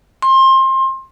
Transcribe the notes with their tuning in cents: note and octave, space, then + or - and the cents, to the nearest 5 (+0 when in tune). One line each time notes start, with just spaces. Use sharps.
C6 +25